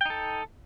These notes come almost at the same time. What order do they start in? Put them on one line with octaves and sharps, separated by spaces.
G5 D#4 A4